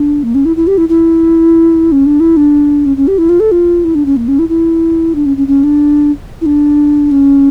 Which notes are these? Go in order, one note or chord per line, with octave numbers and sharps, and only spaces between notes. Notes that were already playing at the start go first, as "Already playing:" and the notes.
Already playing: D4
A#3
C#4
E4
E4
G4
E4
E4
C#4
D4
E4
D4
C#4
C#4
G4
E4
F4
A4
F4
E4
D4
C#4
A#3
C#4
E4
E4
D4
C#4
C#4
C#4
D4
E4
D4
C#4